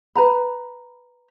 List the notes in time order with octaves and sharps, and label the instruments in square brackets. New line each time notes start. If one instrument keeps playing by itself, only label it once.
[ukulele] B4 A#5 B5